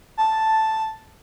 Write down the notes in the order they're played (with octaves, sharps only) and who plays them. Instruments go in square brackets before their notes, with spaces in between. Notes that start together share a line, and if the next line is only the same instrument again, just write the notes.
[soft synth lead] A5